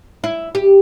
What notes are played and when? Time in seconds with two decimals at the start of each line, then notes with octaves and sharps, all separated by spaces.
0.24 E4
0.55 G4